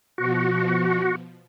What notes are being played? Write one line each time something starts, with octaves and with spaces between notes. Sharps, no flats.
B2 F3 F#4